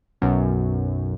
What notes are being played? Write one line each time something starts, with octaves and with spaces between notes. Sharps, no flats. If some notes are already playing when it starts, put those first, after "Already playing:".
B1 F#2